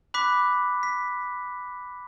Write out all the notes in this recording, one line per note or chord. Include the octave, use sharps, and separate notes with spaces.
B5 D6 F#6 B6
B6